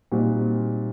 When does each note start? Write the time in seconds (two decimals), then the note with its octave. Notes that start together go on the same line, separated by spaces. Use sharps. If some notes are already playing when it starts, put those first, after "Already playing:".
0.12 A#2 G3 C4 D#4 F#4